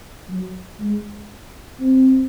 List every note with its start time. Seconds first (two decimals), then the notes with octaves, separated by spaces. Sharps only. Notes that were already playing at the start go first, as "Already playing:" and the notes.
0.29 F#3
0.80 G#3
1.80 C4